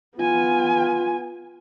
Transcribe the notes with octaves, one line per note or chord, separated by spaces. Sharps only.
B3 F4 G#5